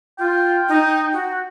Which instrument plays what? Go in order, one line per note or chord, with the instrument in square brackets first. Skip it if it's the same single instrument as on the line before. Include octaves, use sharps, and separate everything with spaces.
[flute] F4 [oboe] G5
[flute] D#4
F#4